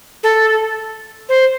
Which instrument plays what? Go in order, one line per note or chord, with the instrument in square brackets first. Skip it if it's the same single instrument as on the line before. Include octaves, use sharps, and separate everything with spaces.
[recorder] A4
C5